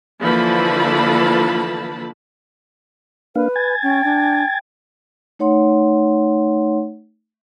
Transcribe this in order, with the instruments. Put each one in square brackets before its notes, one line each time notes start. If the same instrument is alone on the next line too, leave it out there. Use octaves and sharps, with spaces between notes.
[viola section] D3 E3 F3 A#3 A5 B5
[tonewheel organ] A#3 D4 F5 [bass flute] B4
[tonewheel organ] G#5 G#6 A6
[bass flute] C#4 [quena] G5
[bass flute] D4
[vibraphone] A3 D#4 C#5 F#5 C6